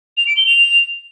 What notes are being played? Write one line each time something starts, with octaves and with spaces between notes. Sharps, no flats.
F7
D7
G7
F7